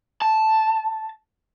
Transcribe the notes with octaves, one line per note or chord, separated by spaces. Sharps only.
A5